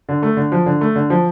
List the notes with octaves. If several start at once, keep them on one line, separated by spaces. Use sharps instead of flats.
D3
A3
D3
F3
D3
A3
D3
F3